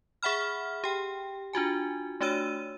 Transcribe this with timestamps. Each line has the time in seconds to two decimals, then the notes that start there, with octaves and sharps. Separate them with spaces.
0.23 G#4 E5 F#5 B5 F6
0.84 G4 G5
1.53 D4 F4 F#4 G#5
2.20 A3 D4 F#4 C#5 E6 D#7